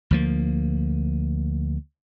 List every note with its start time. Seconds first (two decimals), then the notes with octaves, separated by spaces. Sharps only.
0.11 D2 F3 A#3